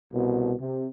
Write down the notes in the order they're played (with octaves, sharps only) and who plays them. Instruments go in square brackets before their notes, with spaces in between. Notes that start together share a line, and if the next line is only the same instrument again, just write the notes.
[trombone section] C2 B2
C3